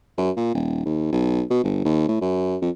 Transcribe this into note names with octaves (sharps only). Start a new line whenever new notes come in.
F#2
A#2
D#1
D#2
B1
B2
G1
D#2
A2
F#2
F2